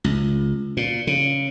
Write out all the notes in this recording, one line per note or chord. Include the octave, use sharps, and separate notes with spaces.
C#2
A#2
C#3